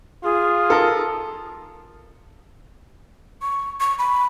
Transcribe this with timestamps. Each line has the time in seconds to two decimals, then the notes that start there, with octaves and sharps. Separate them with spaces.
0.23 F4 G#4
0.70 A4 A#4
3.42 C#6
3.80 C#6
3.99 B5